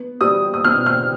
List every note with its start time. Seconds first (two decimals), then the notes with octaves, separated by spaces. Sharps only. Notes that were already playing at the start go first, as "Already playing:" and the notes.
Already playing: B3
0.21 G3 D#6
0.54 D#6
0.65 B2 F6
0.86 F6